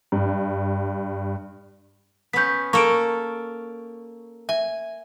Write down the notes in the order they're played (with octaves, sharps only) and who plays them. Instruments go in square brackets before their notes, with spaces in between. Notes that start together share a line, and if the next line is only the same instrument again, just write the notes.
[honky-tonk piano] G2
[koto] B3 C#4 [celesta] G6 B6
[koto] A#3 A4 [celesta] C#6 F6 D7
[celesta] E5 [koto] G#5